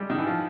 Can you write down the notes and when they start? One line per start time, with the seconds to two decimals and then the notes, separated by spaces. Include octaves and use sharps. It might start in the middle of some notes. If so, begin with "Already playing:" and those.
Already playing: G3 G#3
0.10 D#3
0.18 E3
0.27 F3